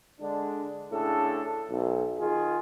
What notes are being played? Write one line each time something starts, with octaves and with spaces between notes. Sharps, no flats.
D3 G#3 D4
A2 C#3 D4 G#4 A4
B1
D#3 F4 G#4